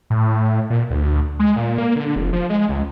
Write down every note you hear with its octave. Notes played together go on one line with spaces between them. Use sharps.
A2
A#2
D2
G#3
A#2
A#3
D3
F1
F3
G#3
C#2